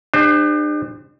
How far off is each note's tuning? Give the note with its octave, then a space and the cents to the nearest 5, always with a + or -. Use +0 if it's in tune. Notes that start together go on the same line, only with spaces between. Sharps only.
D4 +40 G4 +45 C5 +0